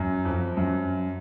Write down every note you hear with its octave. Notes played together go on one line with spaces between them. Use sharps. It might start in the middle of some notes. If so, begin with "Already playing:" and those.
Already playing: F#2
F2
F#2